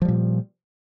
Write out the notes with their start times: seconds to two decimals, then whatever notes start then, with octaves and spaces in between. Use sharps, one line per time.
0.02 F3
0.05 G3
0.08 A#2